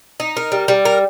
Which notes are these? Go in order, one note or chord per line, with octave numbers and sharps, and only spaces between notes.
D#4
A#4
G3
G3
A#4